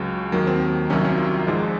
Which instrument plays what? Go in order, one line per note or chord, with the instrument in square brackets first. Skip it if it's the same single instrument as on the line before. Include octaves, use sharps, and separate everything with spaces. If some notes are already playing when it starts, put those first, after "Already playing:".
Already playing: [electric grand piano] C#2 C#3 F#3
D#2 D#3 F#3 A#3
C4
C2 C3 D#3 F#3 C#4
C#4
F4
G#1 G#2 F3 G#3